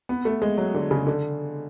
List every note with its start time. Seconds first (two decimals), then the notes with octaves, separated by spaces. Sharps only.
0.09 B3
0.25 A3
0.42 G#3
0.58 F#3
0.75 D3
0.91 C#3
1.07 D3